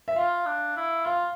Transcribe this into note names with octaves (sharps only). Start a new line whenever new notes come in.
E5
F4 F5
D4
E4
F4 F5